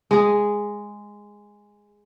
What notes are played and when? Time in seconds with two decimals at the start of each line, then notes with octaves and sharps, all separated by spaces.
0.11 G#3 G#4